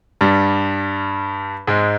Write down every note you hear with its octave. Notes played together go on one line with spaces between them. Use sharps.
G2 G3
G#2 G#3